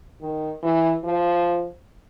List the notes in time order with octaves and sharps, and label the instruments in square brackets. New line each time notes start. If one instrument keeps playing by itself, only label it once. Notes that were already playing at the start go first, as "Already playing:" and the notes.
[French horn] D#3
E3
F3